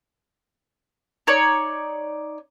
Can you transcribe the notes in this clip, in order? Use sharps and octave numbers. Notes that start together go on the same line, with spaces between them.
D#4 C#5 D5